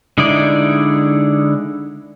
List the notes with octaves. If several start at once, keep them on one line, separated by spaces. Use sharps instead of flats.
D3 G#3 D#4 E4 D5